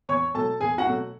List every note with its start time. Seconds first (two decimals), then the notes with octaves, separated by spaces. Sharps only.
0.09 E2 C#5 C#6
0.34 B2 F#3 A3 A4 A5
0.61 E2 G#4 G#5
0.78 F#4 F#5
0.87 B2 F#3 A3